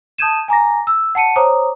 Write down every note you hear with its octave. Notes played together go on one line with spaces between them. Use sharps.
A5 D#6 G6 G#6 D#7 E7
G#5 A#5 D6 A#6
E6
F#5 A5 C#7 D#7
C5 C#5 A#5 D6 D#6